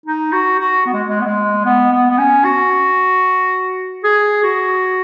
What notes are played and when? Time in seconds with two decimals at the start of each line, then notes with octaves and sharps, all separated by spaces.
0.06 D#4
0.32 F#4
0.60 F#4
0.86 B3
0.93 G#3
1.09 G#3
1.21 B3
1.26 G#3
1.65 B3
1.92 B3
2.11 B3
2.18 C#4
2.44 F#4
4.04 G#4
4.43 F#4